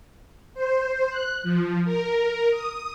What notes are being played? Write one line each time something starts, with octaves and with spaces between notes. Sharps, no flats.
C5
F#6
F3
A#4
D#6